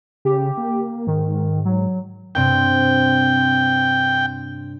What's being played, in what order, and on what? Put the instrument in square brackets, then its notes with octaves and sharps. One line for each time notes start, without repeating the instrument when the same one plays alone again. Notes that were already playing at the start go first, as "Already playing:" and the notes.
[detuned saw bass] C#3 [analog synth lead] G4
[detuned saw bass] A#3
[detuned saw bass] G#2 [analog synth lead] D#3
[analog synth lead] F#3
[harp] G2 C3 C4 [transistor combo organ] G5